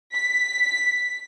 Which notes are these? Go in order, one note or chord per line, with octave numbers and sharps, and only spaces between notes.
B6